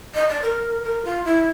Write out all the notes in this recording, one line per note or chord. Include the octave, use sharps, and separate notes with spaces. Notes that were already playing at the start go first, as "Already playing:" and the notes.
D#5
D5
A#4
A#4
F4
E4